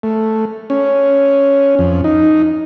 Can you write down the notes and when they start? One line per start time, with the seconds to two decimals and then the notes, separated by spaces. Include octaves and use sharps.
0.03 A3
0.70 C#4
1.79 F2
2.04 D#4